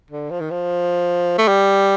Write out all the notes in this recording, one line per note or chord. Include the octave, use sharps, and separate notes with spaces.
D3
F3
D#3
F3
A3
G3